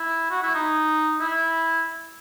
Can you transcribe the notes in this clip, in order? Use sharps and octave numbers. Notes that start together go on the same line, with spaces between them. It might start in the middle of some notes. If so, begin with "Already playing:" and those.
Already playing: E4
F#4
E4
D#4
E4